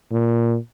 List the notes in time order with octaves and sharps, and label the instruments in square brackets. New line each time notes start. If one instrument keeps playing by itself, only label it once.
[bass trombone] A#2